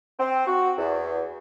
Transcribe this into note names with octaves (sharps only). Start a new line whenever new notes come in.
C4
F#4
E2